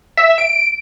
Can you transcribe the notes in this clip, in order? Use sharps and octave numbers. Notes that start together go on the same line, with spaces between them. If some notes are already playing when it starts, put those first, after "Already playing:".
E5
D7